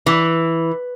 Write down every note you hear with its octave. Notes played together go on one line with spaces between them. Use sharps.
E3